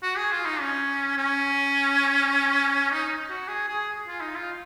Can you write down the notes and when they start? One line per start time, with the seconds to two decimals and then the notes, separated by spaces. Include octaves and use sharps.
0.03 F#4
0.17 G#4
0.32 F4
0.46 D#4
0.60 C#4
1.17 C#4
2.92 D#4
3.30 F#4
3.48 G#4
3.68 G#4
4.07 F4
4.21 D#4
4.36 F4